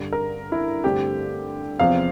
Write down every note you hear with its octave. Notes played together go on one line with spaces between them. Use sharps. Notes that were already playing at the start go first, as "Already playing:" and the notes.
Already playing: G2 D3 G3
A#4
E4
G2 D3 A3 C4 G4
E2 C3 F3 C4 F5